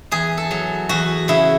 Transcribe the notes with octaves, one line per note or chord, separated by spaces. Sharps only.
E2 G#4
A4
F#3
E2 F#4
C#3 E4